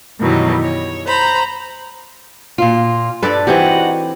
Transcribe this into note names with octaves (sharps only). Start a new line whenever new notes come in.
F#2 B2 D#3 E3 F#3 G3
C#5
C5 A#5 B5
A#2 F4
G2 D4 A4 B4 D5
E3 C4 D#4 F#4 G4